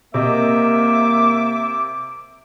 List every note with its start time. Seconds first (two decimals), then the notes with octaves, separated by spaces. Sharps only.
0.14 C3 A#3 D#5 E5 D6